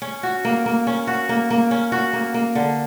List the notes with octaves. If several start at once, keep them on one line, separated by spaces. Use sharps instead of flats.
C#4
F#4
A#3
A#3
C#4
F#4
A#3
A#3
C#4
F#4
A#3
A#3
D3